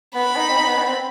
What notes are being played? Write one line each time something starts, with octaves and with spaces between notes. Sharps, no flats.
B3 B5
D#4
C4
D#4
B3
D#4
B3
C4